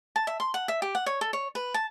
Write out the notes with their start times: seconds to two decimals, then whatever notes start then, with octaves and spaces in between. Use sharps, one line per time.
0.16 A5
0.27 E5
0.40 C6
0.54 F#5
0.68 E5
0.82 G4
0.95 F#5
1.06 C#5
1.21 A4
1.33 C#5
1.55 B4
1.74 A5